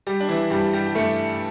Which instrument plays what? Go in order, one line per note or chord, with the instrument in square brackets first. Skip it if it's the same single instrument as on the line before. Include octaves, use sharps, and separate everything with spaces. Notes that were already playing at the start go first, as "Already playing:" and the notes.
[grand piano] G3 G4
D4
E3 E4
G2 G3 G4
G3 G4
G4
G2 A3 A4